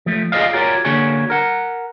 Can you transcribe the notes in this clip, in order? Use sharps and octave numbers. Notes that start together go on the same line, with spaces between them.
F3 A3
F4 G#4 B4 D5 D#5 F5
F4 F#4 G#4 A#4 C#5 D5
D3 A#3 D4 F#4 G#4 C#5
A#4 F#5